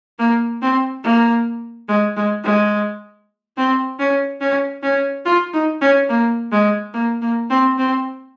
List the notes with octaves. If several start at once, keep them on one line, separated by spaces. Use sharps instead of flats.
A#3
C4
A#3
G#3
G#3
G#3
C4
C#4
C#4
C#4
F4
D#4
C#4
A#3
G#3
A#3
A#3
C4
C4